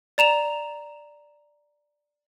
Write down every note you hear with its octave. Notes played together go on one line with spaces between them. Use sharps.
D5 A#5 E7 F7